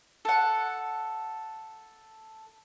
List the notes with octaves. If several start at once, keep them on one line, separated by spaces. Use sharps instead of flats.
A4 F#5